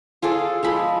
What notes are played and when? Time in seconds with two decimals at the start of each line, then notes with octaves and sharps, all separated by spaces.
0.22 F4 G#4 A4 D5
0.63 F3 G#3 B5